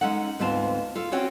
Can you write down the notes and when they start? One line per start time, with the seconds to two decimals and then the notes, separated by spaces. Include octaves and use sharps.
0.01 G#3 C#4 D#4 A4 F#5
0.39 D2 G#2 B3 C4 F4 A5
0.95 F4 A4
1.12 C4 C#4 F#4 C#5 G5